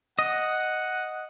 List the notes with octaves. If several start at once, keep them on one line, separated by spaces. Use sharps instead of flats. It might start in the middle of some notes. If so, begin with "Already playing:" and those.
D#5 F#5